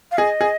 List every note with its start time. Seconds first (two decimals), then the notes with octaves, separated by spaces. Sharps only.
0.11 F5
0.18 G#4 D#5
0.41 G#4